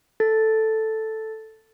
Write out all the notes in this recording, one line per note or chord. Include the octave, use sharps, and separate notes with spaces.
A4 A6